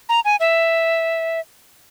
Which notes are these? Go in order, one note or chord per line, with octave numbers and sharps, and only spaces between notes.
A#5
G#5
E5